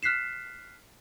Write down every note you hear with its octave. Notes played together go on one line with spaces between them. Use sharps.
F6 F#6 B6 C7 E7